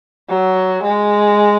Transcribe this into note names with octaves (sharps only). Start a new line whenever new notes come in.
F#3
G#3